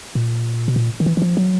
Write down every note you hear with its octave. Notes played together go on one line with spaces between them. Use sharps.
A#2
B2
A#2
D#3
E3
E3
F3
F#3